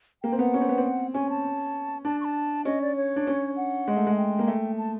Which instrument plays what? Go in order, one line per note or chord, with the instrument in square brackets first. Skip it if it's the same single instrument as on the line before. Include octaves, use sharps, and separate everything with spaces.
[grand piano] A#3 [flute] G5
[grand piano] C4
[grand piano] B3 [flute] F#5
[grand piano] C#4
C4
B3
C4
[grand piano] C#4 [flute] G#5
[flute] A5
[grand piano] D4 [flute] A5
[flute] C#6
A5
[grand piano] C#4 [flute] D#5
[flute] D5
C#5
[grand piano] D4
C#4
[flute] F#5
[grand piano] G#3
A3
G#3
[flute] G5
[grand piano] A#3
A3
[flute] A5